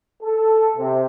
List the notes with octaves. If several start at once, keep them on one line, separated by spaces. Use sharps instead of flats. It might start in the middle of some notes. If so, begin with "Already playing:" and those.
A4
C3